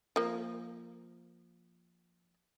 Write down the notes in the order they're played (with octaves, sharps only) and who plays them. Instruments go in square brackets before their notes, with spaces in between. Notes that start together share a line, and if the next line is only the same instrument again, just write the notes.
[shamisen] F3 A#3